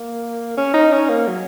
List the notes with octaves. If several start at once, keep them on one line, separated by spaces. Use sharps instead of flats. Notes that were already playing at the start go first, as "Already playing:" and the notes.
Already playing: A#3
C#4
D#4
C#4
A#3
F#3